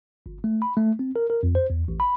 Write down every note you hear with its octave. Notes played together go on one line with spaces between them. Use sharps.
G1
A3
B5
A3
C4
A#4
A#4
F2
C5
E2
A1
B5